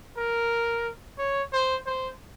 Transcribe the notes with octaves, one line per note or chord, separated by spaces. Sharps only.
A#4
C#5
C5
C5